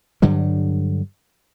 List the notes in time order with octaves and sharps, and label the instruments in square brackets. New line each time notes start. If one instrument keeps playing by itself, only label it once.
[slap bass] G2 D3 F#3 G3